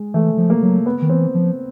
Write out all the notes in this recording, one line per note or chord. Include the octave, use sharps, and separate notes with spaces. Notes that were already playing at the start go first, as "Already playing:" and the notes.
Already playing: G#3
E3 A3
F3
A#3
F#3
B3
D#3
E3 C4
F3